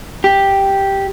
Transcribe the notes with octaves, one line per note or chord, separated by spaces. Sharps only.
G4